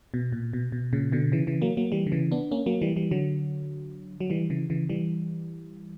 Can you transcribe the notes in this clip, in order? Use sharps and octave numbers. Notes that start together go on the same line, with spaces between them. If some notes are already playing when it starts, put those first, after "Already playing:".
B2
A#2
B2
B2
A#2 C#3
B2 D3
C#3 E3
C#3 E3
F#3 A#3
F#3 A#3
E3 G3
D3
C#3 E3
B3 D4
A#3 C#4
F#3 A#3
E3 G3
E3 G3
D3 F#3
F#3
E3 G3
C#3 E3
C#3 E3
E3 G3